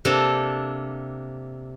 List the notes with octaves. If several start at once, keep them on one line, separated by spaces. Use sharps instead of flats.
C3 A#3 D4 A4